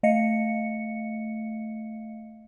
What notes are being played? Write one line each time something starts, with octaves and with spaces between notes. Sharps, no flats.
A3 D#5 F5 C#7